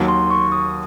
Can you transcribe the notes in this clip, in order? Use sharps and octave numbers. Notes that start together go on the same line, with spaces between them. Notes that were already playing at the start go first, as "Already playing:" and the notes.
Already playing: D#2 D#3 F#3
C6
C#6
D#6